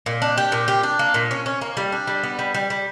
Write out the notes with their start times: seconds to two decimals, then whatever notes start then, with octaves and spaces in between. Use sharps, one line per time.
0.06 A#2
0.22 D4
0.38 G4
0.52 A#2
0.68 G4
0.83 D4
0.99 A#3
1.14 A#2
1.31 C#4
1.46 C#4
1.61 A#3
1.77 G3
1.92 D4
2.07 G3
2.23 B3
2.39 G3
2.54 G3
2.70 G3